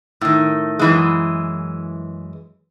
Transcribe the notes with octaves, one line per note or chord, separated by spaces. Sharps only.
A2 D#3
F#2 E3 G#3